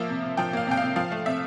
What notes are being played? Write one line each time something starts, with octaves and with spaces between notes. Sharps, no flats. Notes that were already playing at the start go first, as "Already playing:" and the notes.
Already playing: F3 A#3 E5
C3
C3
F3 G5
A#3 F5
C3 G5
C3 F5
F3 F5
A3
C3 E5